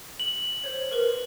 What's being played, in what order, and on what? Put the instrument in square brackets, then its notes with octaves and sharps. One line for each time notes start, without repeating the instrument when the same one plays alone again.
[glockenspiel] F#7
[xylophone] C5 C#5
A#4 B4